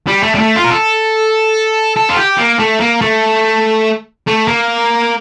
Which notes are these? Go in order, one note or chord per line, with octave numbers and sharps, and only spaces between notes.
G3
A3
G3
A3
F4
A#4
A4
A4
F4
G4
A#3
A3
A#3
A3
A3
A#3